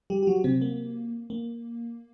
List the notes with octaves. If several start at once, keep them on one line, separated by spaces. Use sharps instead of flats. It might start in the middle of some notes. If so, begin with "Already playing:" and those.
G3 G4
G4
F#3 F#4
C3 C4
A#3
A#3